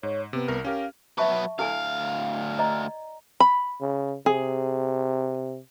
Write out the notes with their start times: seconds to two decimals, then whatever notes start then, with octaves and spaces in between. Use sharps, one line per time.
0.03 G#2 C#5
0.33 C3 B3
0.48 C2 A#4 F6
0.65 C#4 G4 A#4 F5
1.18 F#3 B4 E5 A5 C#6
1.59 D2 E4 A4 F5 G#5
2.59 D5 D#5 A#5
3.40 B5
3.81 C#3
4.26 C3 G#4